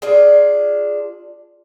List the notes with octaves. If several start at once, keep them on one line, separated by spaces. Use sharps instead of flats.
D4 F4 G#4